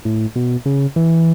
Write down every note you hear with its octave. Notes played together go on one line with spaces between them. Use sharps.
A2
B2
C#3
E3